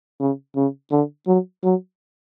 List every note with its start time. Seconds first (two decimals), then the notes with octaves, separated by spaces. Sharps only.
0.20 C#3
0.56 C#3
0.91 D3
1.27 F#3
1.64 F#3